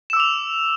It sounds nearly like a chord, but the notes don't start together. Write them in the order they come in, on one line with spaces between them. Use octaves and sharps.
E7 E6 D6 F7